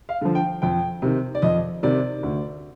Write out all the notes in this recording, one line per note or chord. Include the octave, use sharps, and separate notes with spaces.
F5
D3 F3
G5
F2 G5
C3 D#3
D5
F2 D#5
C3 D#3 D5
D2